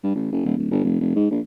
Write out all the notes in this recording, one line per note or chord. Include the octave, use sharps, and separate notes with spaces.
G2
A1
F#1
D#1
D1
G1
F1
F1
G#2
A#1